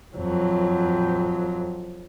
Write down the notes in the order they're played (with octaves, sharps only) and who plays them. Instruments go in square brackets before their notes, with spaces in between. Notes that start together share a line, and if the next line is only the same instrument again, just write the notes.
[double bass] F2 F#3